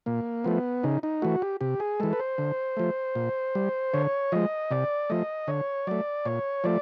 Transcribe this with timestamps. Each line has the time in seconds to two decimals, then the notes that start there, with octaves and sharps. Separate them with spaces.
0.06 A#2 A#3
0.44 F3 A3 B3
0.83 C#3 D#4
1.03 D#4
1.22 E3 A3 F#4
1.42 G4
1.61 C3 G4
1.80 G#4
2.00 E3 G#3 A4
2.13 B4
2.20 C5
2.38 D3
2.77 F3 A3
3.15 A#2
3.55 G3
3.94 D3 C#5
4.32 F3 G#3 D#5
4.71 C3 D5
5.10 F3 A3 D#5
5.48 D3 C#5
5.87 F#3 A3 D5
6.25 A#2 C#5
6.64 F3 A3 D5